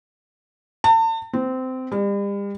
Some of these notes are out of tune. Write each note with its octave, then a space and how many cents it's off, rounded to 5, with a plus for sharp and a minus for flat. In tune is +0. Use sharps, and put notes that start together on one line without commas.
A5 +40
C4 -20
G3 +40